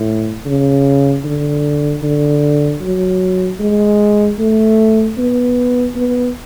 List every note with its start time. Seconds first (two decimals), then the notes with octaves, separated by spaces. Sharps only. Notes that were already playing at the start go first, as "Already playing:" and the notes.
Already playing: A2
0.46 C#3
1.24 D3
2.03 D3
2.81 F#3
3.60 G#3
4.39 A3
5.18 B3
5.96 B3